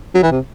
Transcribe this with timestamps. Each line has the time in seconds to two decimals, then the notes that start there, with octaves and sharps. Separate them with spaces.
0.15 F#3
0.23 E3
0.31 C3